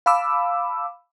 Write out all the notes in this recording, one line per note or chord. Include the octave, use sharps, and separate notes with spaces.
F5 A5 B5 D6 E6